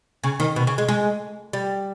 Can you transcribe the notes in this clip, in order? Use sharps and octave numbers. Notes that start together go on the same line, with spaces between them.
C#3
D#3
B2
C#3
G#3
G#3
G3